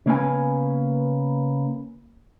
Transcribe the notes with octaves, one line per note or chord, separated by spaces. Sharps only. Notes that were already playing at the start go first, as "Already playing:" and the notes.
C#3 A#3 B3 G#5